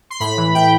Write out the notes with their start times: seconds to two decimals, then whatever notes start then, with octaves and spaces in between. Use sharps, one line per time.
0.10 C6
0.20 A2 B5
0.37 E3
0.55 A2 G5